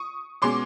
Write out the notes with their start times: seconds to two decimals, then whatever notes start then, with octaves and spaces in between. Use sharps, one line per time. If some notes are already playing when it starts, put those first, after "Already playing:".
Already playing: C#6 D#6
0.42 B2 G#3 C#4 C6 D6